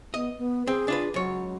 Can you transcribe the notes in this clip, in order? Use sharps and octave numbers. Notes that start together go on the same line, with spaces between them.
B3 D#5
B3
C4 G#4
D4 F4 B4
C#2 F#3 C#5